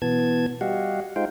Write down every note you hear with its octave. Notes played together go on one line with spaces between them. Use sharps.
B2 E3 B3 A5 G#6
G3 F#4 G4 D#5 F5 F#5
G#3 D#4 F4 C5 F5 G5